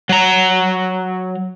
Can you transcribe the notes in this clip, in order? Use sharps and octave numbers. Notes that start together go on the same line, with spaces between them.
F#3 A#5